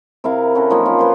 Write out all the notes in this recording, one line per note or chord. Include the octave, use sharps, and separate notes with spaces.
C3 E4 A#4 F5
C#4 F#4 A4
D#3 F3 F#3 A#3
C#4 F4
B4 C5 C6